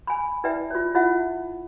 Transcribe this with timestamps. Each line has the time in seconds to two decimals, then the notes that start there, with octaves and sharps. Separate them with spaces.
0.07 G#5 B5
0.44 E4 B4 D5 E5 G5
0.71 F4 C#5
0.95 E4 F4 C#5 E5 F#5